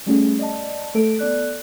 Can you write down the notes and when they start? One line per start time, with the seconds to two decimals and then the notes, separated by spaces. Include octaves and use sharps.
0.06 G3 A3 C#4 F#4 G#4
0.39 D5 D#5 A5
0.94 A3 A4 D7
1.19 B3 A4 D5 F#6